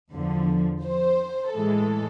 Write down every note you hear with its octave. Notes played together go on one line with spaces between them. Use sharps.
E2 D3 F3
C5
A2 E3 G#3 A4